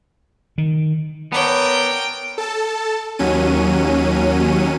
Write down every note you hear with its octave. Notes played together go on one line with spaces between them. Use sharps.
D#3
B3 A#4 C#5 D5 G5 A5
A4 A5
D#2 F#3 C#4 D#7